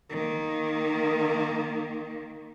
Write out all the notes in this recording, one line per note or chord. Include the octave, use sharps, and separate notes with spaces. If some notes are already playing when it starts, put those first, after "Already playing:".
D#3 A#3